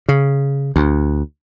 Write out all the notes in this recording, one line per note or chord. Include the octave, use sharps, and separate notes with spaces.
C#3
D2